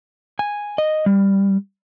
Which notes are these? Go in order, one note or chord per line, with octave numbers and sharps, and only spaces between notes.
G#5
D#5
G3